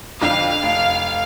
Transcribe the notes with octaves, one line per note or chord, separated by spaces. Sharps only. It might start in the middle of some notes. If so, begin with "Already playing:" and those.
F2 D3 F5
F1